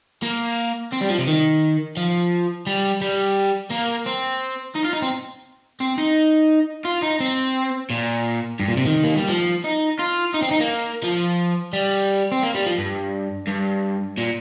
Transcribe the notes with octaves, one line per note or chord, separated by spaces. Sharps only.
A#3
C4
G3
F3
C3
D#3
F3
G3
G3
A#3
C4
D#4
F4
D#4
C4
C4
D#4
F4
D#4
C4
A#2
G2
A#2
C3
D#3
A#3
G3
F3
D#4
F4
D#4
C4
D#4
A#3
F3
G3
C4
A#3
G3
F3
G2
G2
A#2